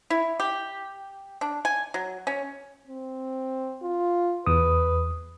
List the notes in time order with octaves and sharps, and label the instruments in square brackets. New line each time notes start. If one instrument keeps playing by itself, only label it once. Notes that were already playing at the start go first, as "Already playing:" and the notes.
[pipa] E4
G4
D4
G#5
F#3
C#4
[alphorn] C4
F4
[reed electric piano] E2 D#6 [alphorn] B4